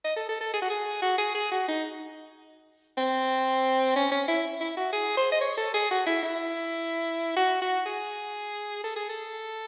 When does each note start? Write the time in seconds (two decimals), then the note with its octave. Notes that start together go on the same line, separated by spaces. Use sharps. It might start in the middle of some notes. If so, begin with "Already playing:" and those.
0.04 D#5
0.16 A4
0.29 A4
0.41 A4
0.53 G#4
0.62 F#4
0.70 G#4
1.02 F#4
1.18 G#4
1.35 G#4
1.51 F#4
1.68 D#4
2.97 C4
3.96 C#4
4.12 C#4
4.28 E4
4.61 E4
4.77 F#4
4.93 G#4
5.17 C5
5.32 D#5
5.41 C#5
5.57 A4
5.74 G#4
5.91 F#4
6.06 E4
6.23 E4
7.36 F#4
7.62 F#4
7.86 G#4
8.84 A4
8.96 G#4
9.09 A4